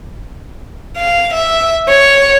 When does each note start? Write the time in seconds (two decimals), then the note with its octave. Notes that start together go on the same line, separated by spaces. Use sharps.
0.97 F5
1.34 E5
1.88 C#5